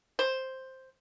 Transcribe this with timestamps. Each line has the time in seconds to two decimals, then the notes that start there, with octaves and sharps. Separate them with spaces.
0.19 C5